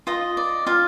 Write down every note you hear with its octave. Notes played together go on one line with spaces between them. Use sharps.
F4 D#5
D5
F4 F5